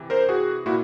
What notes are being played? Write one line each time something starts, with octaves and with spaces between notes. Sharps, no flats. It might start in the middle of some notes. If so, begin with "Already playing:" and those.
Already playing: C3 E3
A#4 C5
F#4 G#4
A#2 E4 F#4